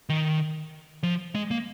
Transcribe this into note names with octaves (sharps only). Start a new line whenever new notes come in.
D#3
F3
G#3
A#3